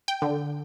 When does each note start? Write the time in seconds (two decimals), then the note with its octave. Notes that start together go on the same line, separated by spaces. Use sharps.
0.08 G5
0.22 D3